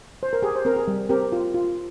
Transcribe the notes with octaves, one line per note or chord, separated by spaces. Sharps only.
C5
A#4
G4 G#4
C5
C4 A#4
G#4
G3
C4 G4 A#4
F4
F4